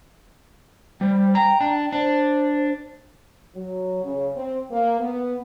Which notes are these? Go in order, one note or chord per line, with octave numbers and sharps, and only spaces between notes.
G3 C5
G5 A#5
D4
D4 C5
F#3
C#3
C4
A#3
B3